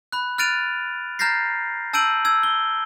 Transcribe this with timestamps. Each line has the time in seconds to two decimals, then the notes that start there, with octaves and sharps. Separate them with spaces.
0.12 B5 F#6
0.38 F6 F#6 A6 D7 D#7 F7
1.19 A#5 F6 G6 A6 A#6 C7
1.93 A5 E6 G6 D7 D#7 F#7
2.25 E6 G#6
2.43 G7